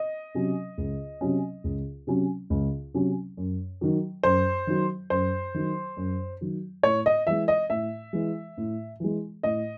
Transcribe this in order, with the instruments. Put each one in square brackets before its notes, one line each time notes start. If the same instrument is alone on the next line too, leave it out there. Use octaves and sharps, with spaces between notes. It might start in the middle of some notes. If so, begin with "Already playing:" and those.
Already playing: [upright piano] D#5
[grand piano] C3 F#3 C#4
C#2
C3 F#3 C#4
C#2
C3 F#3 C#4
C#2
C3 F#3 C#4
F#2
D#3 F#3
[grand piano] F#2 [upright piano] C5
[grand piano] D#3 F#3
[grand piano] F#2 [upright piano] C5
[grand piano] D#3 F#3
F#2
D#3 F#3
[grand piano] A2 [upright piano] C#5
[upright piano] D#5
[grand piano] E3 G#3 [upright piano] E5
[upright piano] D#5
[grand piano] A2 [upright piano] E5
[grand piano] E3 G#3
A2
E3 G#3
[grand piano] A2 [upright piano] D#5